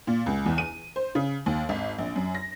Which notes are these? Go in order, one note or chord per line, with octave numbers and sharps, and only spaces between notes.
A#2
C#2
E2
D#7
C5
C#3
D#2
G#1
A#1
F#2
A#6